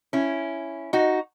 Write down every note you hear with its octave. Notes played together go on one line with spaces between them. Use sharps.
C#4 E4
D#4 F#4